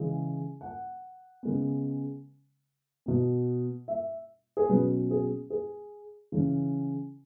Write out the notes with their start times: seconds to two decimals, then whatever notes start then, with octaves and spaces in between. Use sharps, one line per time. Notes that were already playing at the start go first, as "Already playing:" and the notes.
Already playing: C#3 E3 G#3 C#4
0.61 F#5
1.43 C#3 G#3 B3
3.06 B2 B3
3.88 E5
4.57 G#4
4.69 B2 F#3 C#4 B4
5.11 G#4
5.50 G#4
6.32 C#3 E3 C#4